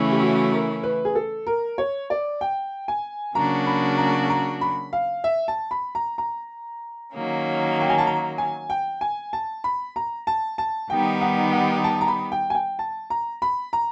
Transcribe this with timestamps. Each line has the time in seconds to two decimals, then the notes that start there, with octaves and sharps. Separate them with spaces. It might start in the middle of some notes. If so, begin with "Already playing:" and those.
Already playing: C#3 E3 A3 C#4 E4
0.12 G4
0.22 F#4
0.52 A#4
0.83 B4
1.05 G#4
1.15 A4
1.47 A#4
1.78 C#5
2.10 D5
2.41 G5
2.88 G#5
3.35 C#3 F#3 A#3 D4 F#4 A#5
3.67 B5
3.98 A#5
4.30 A#5
4.61 B5
4.93 F5
5.24 E5
5.48 A5
5.71 B5
5.95 A#5
6.18 A#5
7.13 D#3 F#3 A#3 C#4
7.81 G5
7.90 G#5
7.98 A5
8.07 A#5
8.38 G#5
8.70 G5
9.01 G#5
9.33 A5
9.64 B5
9.96 A#5
10.27 A5
10.58 A5
10.90 D#3 G3 B3 D#4 G4 G5
11.21 F#5
11.53 F#5
11.84 A5
12.01 A#5
12.08 B5
12.32 G5
12.50 G#5
12.55 G5
12.79 A5
13.10 A#5
13.42 B5
13.73 A#5